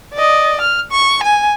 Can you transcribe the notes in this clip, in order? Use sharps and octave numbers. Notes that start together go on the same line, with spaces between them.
D5 D#5
F6
C#6
G#5